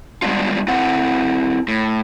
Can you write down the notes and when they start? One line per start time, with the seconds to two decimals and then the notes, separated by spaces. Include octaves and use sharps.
0.22 G3 G#3 B3 D4 F4
0.68 C4 E4 A4 F#5
1.68 A2